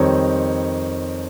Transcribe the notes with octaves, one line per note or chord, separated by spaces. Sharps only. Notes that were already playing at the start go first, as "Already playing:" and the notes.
Already playing: F2 D#3 G3 C4 D#4 C#5